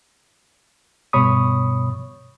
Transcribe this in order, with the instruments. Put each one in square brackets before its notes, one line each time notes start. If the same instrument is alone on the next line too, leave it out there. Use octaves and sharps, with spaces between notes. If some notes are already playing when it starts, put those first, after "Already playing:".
[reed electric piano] G2 B2 C#5 B5 C#6 D#6